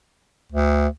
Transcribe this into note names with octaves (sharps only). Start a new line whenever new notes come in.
D2